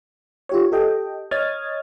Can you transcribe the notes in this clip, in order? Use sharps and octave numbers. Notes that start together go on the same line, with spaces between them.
F4 G4 C#5
G4 A4 D#5 G5
C#5 D#5 D#6 F6 G#6 A6